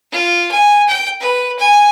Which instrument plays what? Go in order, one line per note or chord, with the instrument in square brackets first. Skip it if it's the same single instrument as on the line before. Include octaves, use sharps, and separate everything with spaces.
[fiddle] F4
G#5
G5
B4
G#5